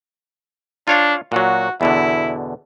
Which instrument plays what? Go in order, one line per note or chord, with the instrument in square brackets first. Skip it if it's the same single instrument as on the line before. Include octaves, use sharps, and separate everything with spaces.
[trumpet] D4 [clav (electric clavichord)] F4 C#5 F5
[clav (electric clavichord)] A#2 F#3 [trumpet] F#4
[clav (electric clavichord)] E2 B2 D3 [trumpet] E4